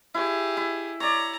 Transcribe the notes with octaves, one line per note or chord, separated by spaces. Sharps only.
E4 G4 G#4
E4
C#5 D5 A#5